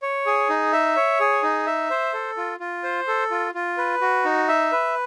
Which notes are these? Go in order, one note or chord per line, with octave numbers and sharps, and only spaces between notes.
C#5
G#4
D#4
E5
C#5
G#4
D#4
E5
C5
A4
F4
F4
C5
A4
F4
F4
B4
F#4
D#4
E5
B4